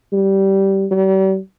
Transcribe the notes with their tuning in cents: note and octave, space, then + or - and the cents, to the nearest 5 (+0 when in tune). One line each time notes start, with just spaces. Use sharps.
G3 -15
G3 -40